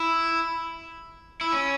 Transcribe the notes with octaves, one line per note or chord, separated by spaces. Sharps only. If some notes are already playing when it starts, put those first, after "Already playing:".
Already playing: E4
E4
C#4